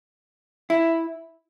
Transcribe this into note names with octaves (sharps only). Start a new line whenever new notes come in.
E4